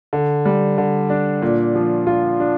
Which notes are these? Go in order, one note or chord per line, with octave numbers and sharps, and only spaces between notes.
D3
G3
D3
D4
A#2
F3
F4
D4